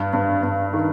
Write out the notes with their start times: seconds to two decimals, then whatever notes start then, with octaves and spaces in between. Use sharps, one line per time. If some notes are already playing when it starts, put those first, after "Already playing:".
Already playing: G2
0.13 G2
0.43 G2
0.73 D#3